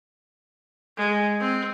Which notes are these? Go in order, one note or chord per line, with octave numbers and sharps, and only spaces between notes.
G#3
C4